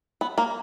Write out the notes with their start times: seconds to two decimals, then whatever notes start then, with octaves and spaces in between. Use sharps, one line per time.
0.21 B3
0.38 A#3